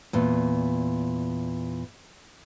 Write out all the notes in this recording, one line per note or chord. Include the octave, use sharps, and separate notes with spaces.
E2 A#2